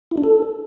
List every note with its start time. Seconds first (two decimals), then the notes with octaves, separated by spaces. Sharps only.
0.11 E4
0.17 D4
0.24 A4